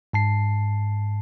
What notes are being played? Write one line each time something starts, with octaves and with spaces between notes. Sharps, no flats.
G#2 A5 C7